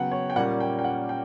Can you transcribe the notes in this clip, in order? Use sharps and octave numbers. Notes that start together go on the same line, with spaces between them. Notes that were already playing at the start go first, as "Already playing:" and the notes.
Already playing: C#3 F#3 B3 F#5 G5
C#5
G5
A#2 G3 A#3 C#4 F#5
G5
G5
F#5
G5